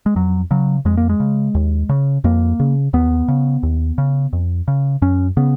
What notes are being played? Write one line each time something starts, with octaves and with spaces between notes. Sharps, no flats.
G#3
F2 F#3
C#3 F#3
F2 G#3
A#3
G#3
C#3
D#2
C#3
F2 A#3
C#3
D#2 B3
C#3
D#2
C#3
F2
C#3
F#2 C#4
C#3 B3